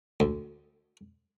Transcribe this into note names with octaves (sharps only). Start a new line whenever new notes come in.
D2